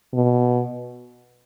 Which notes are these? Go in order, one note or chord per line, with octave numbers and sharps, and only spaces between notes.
B2